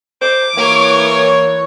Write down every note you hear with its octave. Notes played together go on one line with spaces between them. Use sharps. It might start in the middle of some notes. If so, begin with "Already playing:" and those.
C5 D6
E3 A#3 A#4 C#5